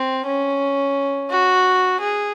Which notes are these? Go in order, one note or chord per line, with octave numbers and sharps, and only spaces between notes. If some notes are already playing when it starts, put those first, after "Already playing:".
Already playing: C4
C#4
F#4
G#4